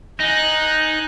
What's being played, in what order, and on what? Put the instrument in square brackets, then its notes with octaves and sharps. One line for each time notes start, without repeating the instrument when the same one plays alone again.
[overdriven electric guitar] D#4 [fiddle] G#5 F#6